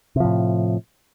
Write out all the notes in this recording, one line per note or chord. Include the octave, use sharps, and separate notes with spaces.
A2 C3 F3